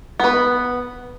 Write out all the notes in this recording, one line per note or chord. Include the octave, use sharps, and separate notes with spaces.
B3 B4